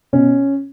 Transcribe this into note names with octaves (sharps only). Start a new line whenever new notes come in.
B2 C#4